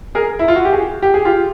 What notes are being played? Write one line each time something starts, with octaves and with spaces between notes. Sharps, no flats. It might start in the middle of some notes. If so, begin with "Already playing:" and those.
G#4 A#4
E4
F4
F#4
G4
F#4 G#4
G4
G#4
F4 G4